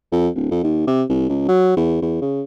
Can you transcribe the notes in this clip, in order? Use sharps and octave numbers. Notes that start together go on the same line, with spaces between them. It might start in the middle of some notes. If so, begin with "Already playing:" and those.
F2
D1
F2
D#2
C3
C2
C#2
F#3
E2
E2
C#3